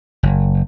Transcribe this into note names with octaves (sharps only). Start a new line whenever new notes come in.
F#1